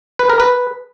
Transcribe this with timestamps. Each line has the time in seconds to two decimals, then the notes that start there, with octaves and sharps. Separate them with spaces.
0.19 B4
0.30 A#4
0.40 B4